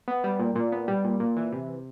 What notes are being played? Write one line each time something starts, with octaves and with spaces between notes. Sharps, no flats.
B3
G3
A#2
A#2
B3
G3
A#2
A#2
E3
C3